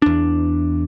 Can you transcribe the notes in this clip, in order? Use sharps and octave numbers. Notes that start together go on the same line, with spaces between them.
E2 D4